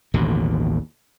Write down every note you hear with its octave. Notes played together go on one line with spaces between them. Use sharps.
A1 D#2 B2 D3